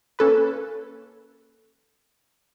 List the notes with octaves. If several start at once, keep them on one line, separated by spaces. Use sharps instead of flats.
A#3 C#4 A4 B4